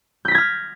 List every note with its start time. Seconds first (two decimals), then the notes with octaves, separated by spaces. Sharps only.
0.25 G6
0.28 B6
0.31 A#6
0.35 G#6
0.38 F6